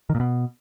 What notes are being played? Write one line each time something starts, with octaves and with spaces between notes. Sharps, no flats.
D#3
A#2
B2